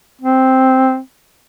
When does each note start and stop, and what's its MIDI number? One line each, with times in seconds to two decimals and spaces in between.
0.22 0.99 60